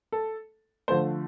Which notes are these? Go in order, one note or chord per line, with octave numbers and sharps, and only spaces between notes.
A4
D3 F3 A3 C5